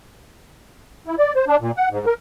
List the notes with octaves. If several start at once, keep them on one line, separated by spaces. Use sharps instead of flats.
E4
D5
C5
D4
A#2
F#5
G#2
A#4